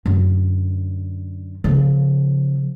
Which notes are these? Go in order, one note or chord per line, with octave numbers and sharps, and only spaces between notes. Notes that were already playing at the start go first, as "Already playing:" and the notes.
F#2 D3
C#3 F3